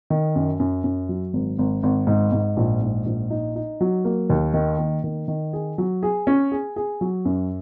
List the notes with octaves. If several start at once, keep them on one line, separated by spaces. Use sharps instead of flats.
D#3
F#2
F#2
F#2
F#3
G#1
G#1
G#1
G#2
G#2
A#1
G#2
A#1
D#4
D#4
F#3
A#3
D#2
D#3
A#3
D#3
D#3
G#4
F#3
G#4
C#4
G#4
G#4
F#3
F#2